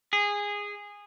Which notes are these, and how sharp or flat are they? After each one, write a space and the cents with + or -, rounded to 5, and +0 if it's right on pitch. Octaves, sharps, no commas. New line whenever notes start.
G#4 -15